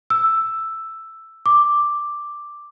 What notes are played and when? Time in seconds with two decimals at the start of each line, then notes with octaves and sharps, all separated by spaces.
0.10 E6
1.46 D6